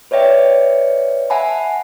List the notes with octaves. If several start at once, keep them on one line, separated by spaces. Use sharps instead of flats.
B4 C#5 D5 E5 G5
E5 F#5 G#5 A5 B5